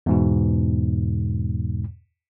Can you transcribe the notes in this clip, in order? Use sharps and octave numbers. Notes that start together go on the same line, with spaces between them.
E2 G#2 B2